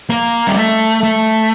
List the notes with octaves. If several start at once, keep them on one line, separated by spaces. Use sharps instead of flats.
A#3
G3
A3
A3